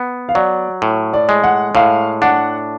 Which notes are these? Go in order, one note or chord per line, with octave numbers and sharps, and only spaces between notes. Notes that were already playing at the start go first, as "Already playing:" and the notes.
Already playing: B3
F5
F#3 D5
A2
D5
G#3
F#5
A2 F5
D4 F#5